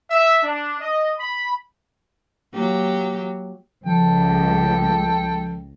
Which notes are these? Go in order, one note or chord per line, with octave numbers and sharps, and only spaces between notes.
E5
D4
D#5
B5
F#3 A#3 G4
C#2 F3 A4 G5